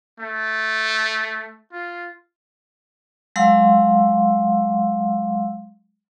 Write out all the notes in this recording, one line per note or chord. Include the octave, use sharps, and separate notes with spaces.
A3
F4
F#3 G#3 F5 F#5 C6 E6